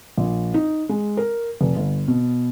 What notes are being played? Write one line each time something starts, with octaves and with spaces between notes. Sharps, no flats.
A#1
D#4
G#3
A#4
F1
G1
B2